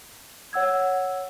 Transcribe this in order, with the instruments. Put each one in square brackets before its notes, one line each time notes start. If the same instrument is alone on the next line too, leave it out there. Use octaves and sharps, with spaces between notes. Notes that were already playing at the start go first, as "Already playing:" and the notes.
[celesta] C#5 F#5 E6 G#6